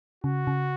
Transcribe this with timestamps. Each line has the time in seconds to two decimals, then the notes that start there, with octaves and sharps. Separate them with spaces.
0.24 C#3 F#4
0.47 C#3